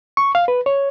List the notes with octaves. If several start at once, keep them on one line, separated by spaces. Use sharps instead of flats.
C#6
F5
B4
C#5